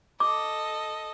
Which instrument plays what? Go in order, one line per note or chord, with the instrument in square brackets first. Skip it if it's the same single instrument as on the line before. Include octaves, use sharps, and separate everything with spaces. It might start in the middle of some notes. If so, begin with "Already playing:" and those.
[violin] A4 D#5 [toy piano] D6